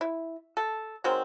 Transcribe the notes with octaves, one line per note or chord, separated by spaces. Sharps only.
E4
A4
D#3 F#3 G#3 C4